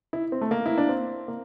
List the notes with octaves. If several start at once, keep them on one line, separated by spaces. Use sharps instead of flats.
E4
C4
A3
A#3
E4
D4
C4
A#3